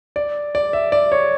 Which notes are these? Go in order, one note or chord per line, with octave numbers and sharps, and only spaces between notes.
D5
D5
E5
D5
C#5